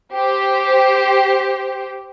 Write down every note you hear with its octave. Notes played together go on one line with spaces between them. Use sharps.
G4 C5